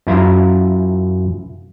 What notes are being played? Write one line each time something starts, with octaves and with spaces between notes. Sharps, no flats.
F#2 E4 F4 A#5